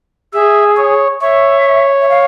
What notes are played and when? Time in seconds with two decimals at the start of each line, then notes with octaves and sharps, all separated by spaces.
0.33 G#4 E5
0.77 C#5
1.21 C#5 E5
2.00 E5
2.08 F5